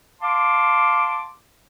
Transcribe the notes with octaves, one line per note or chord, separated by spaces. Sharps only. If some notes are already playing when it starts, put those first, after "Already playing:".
F5 A5 C6 D6